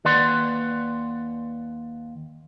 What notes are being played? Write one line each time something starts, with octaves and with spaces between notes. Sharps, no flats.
D#2 B4 D5 F#5 C6